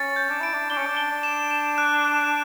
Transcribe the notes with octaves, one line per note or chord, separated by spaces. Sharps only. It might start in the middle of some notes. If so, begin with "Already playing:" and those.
Already playing: C#4 A6
G6
D4
E4 D7
D4
D4 G7
C#4
D4
G7
D4
E7
E7
F#6
F#6